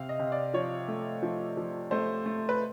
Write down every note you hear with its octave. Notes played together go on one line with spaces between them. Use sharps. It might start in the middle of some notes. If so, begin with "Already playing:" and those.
Already playing: C3 F5
D#5
C3
D5
F3 C#5
A3
F3
F3
A3 C5
A3
B4